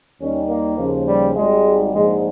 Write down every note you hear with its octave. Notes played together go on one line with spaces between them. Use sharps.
D#2 D#3 G3 C#4
A#3
D#2 C#3 F3
G3
G#1 G#2 G3 G#3
A#1 G#2 F3 G#3